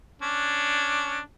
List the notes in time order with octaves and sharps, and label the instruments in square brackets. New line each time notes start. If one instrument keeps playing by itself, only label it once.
[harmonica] C#4 D4